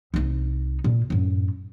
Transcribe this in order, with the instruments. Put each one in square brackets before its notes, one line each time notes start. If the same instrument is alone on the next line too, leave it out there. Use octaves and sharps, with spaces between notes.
[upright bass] C2 D#4
A#2
F#2 A2